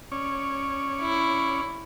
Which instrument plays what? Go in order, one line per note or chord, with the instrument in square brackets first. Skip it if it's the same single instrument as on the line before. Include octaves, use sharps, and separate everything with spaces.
[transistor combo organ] C#4 C#5 D5
[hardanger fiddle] E4